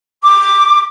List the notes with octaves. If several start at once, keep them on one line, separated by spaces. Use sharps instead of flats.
D6